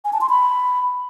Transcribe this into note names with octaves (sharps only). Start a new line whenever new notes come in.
G#5
A5
C6
B5